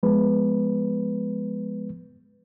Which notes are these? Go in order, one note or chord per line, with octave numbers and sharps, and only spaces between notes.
F3 G#3 B3 B4